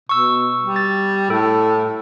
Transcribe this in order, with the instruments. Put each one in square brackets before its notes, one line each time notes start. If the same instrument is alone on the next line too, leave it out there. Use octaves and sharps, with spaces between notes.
[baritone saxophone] B2 [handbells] C#6 E6
[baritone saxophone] G3
[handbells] A6
[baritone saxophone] A2 [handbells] A4